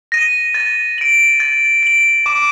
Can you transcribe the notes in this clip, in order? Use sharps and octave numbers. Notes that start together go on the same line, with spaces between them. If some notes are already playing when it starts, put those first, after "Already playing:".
A#6 D#7
A6
D7 F#7
A6
D7 F#7
D6